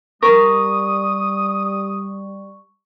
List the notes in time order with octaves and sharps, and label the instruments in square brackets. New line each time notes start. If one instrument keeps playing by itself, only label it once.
[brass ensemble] G3 [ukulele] A#4 [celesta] C#6 [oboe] D#6